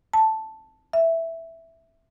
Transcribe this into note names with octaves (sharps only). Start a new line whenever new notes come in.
A5
E5